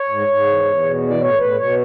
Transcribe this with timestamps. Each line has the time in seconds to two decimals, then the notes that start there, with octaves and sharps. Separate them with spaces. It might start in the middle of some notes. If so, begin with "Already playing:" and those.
Already playing: C#5
0.09 G#2
0.27 G#2
0.46 E2
0.64 E2
0.83 B2
1.03 E3
1.09 D5
1.21 A2 C#5
1.39 A2 B4
1.58 B2 C#5